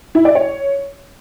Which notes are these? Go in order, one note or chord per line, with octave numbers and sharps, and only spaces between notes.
E4
D5
C#5